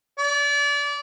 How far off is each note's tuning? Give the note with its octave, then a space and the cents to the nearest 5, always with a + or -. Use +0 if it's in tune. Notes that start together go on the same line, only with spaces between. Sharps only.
D5 -30